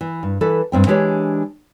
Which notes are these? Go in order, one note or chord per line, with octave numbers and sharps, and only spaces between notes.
E3
G2
E3 A4 B4
G2 C4 G5
E3 G#3 D4 G4 C#5